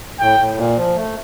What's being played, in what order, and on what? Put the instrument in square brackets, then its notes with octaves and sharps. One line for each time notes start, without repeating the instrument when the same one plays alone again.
[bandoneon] A2 [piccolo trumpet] G5
[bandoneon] A2
A#2
F3
A3